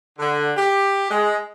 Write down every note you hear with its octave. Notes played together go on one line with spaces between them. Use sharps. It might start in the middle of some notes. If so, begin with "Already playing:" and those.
D3
G4
G#3